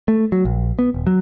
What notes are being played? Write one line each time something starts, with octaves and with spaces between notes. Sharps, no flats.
A3
F#3
A#1
B3
D#1
F#3